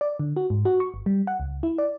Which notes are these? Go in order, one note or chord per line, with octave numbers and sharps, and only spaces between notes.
D5
D3
F#4
G#2
F#4
C#6
G1
G3
F#5
C#2
E4
D5